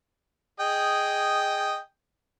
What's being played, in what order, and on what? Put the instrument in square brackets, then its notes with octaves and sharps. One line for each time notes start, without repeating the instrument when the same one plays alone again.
[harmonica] G#4 D#5 G5